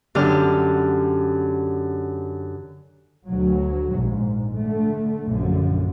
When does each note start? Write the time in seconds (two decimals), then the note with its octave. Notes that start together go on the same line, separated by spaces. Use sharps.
0.15 F#2 D3 G4 F6
3.26 D2 F#3
3.93 A#1 G#2
4.56 D3 A3
5.26 A#1 F#2 D3